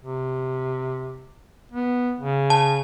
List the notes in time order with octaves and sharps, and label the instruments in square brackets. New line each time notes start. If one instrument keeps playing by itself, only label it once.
[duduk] C3
B3
C#3
[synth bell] A5